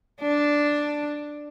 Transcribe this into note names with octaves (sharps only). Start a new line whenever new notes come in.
D4